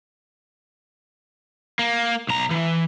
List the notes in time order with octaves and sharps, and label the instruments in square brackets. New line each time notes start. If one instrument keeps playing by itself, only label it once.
[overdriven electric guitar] A#3
B1 A#5
E3